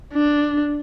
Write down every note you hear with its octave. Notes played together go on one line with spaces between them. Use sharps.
D4